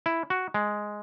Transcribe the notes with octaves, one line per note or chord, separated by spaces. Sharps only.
E4
F#4
G#3